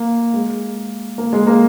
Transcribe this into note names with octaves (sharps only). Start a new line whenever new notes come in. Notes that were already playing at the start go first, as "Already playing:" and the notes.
Already playing: A#3
G#3
A#3
G#3
A#3